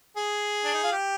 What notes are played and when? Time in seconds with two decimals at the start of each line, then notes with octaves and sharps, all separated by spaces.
0.17 G#4
0.64 D4
0.74 D#4
0.83 F4
0.92 G4